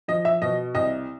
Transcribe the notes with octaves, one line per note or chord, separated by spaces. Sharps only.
F3 D#5
E5
B2 D#5
C2 D#5